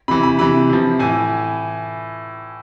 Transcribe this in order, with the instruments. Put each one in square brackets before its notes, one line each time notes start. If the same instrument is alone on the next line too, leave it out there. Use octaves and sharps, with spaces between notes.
[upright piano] C3 E3 B5
B5
C3 E3 B5
C3 F3
A2 E3 G#5